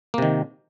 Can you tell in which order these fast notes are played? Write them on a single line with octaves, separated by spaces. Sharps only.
A#3 C3 D#3